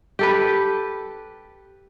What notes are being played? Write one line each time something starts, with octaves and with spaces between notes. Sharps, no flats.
G4 A4 B4